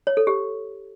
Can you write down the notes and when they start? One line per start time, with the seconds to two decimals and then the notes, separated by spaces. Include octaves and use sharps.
0.07 C#5
0.17 A4
0.27 G4